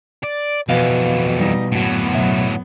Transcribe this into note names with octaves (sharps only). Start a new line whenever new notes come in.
D5
F2 B2 E3 B4 D#5 F5
G3 D#4
F#2 A2 F#3 B3
B1 E5